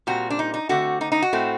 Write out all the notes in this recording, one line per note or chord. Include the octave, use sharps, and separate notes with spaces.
A#2 G3 C4 F#4
D4
D#4
D#4
D3 A3 C4 F#4
D#4
D#4
F#4
A2 A3 C4